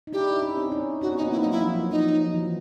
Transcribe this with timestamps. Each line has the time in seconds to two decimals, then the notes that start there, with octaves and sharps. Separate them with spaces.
0.07 D#4
0.12 D4 E4 G4
0.31 E4
0.42 C#4 D#4
0.57 C4 D4
0.72 C#4 D#4
1.01 C#4 D#4 F#4
1.12 B3 C#4
1.17 D#4
1.21 A#3 C4
1.31 A#3 C4 E4
1.41 D#4
1.46 F#3
1.51 E4
1.61 F3
1.75 F#3
1.91 F3 D#4
2.20 F3
2.34 E3